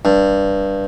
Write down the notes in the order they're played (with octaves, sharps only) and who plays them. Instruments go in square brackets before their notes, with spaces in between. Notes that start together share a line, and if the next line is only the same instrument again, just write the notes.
[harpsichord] G2